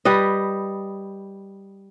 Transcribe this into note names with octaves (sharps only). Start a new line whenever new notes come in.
G3 B4 D#5